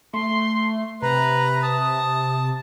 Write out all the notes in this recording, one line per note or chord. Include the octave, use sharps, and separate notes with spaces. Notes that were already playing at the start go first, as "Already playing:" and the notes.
A3 C6
C3 B4 A#5
A5 D#6